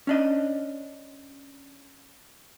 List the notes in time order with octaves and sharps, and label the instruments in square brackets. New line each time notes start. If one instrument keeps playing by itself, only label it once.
[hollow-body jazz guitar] C#4 D4 D#5